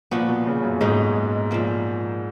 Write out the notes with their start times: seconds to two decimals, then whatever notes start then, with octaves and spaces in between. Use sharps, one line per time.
0.11 A#2 F3 B3 F#4
0.29 B2
0.46 C#3
0.63 F#2
0.81 G#2 B2 G#3 D#4
1.51 A#2 F3 A#3